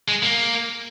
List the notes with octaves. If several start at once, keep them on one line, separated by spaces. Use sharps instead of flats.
G#3
A#3